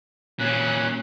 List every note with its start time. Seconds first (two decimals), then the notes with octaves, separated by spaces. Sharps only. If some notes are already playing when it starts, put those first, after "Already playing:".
0.40 A#2 C#4 F#6